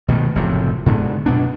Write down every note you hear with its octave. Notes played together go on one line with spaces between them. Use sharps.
B2 D#3 A3
F#1 A2 C3 F3
G#2 D3 B3
F#2 B2 B3 D4